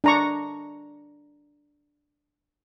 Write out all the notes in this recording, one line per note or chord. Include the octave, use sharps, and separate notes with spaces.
D4 A#5 C#6